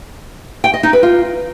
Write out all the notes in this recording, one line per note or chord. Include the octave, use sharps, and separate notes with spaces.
G5
D#5
D#4
B4
F4